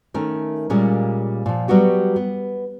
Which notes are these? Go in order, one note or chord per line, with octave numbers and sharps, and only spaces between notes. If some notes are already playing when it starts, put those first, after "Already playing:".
D#3 A3 C#4 A#4
A#2 G3 G#3 A#3 C#4
A#2 F3
F#3 G3 B3 F#4 G4
B3